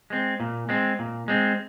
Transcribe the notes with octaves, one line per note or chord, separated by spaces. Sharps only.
G#3 C4
A#2
G#3 C4
A#2
G#3 C4